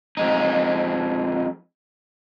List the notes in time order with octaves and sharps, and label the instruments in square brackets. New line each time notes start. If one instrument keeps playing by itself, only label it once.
[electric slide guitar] F2 G#3 D#4